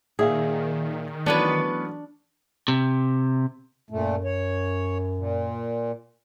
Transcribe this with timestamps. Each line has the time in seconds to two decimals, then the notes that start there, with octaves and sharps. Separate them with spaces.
0.19 A#2 D#3 G#4 E5 F5
1.26 E3 F#3 A3 B3 C#4 D4 B4
2.68 C3
3.90 F#2 A#2 A3
4.24 C#5
5.17 A#2